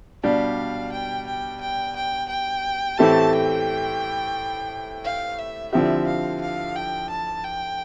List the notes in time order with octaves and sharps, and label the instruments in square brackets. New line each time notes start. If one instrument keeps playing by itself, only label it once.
[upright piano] B2 G3 D4 G4 [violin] F5
[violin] G5
G5
G5
G5
G5
[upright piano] A2 E3 A3 C4 G4 [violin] A5
[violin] G5
F5
E5
[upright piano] D3 F3 C4 E4 G4 [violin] E5
[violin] F5
F5
G5
A5
G5